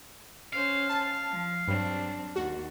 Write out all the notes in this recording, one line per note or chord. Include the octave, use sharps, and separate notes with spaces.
C#4 C5 F5
A5
F3
G2 F#3 C4 D4
D#2 F#4